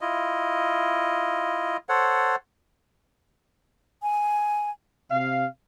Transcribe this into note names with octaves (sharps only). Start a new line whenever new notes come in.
E4 F4 D#5
A4 C5 C#5 F#5
G#5
C3 F5